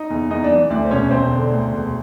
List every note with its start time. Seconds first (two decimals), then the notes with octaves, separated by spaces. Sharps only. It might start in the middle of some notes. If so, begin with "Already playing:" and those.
Already playing: D#4 D#5
0.10 E2
0.30 E2 D#4 D#5
0.43 D4 D5
0.50 E3
0.70 D2 D4 D5
0.85 C5
0.90 E1 C#4 C#5
1.11 E1 C4 C5
1.31 D3
1.51 D2
1.72 E1